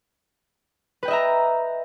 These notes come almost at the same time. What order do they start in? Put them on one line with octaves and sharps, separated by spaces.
B4 G5 D#5 E5 A#5